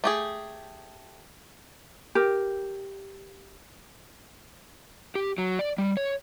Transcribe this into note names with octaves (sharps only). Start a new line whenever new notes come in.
A3 G4 G#4
G4 A#4
G4
F#3
D5
G3
C#5